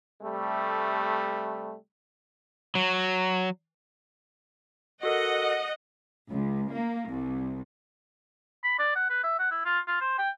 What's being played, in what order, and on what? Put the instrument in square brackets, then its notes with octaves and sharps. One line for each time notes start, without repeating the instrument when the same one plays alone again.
[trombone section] C3 G3 A3
[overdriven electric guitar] F#3
[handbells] F#4 A4 A#4 [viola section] D#5 F#5
[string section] C#2
A#3
C2
[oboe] B5
D5
F#5
B4
E5
F#5
E4
F4
F4
C5
G5